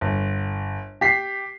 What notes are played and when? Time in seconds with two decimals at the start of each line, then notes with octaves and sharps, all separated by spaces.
0.01 G1
1.01 G4 B6 C7